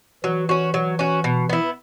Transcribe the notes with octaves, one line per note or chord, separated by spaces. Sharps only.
E3 F#3
C#4 F#4
F#3
C#4 F#4
B2
B3 E4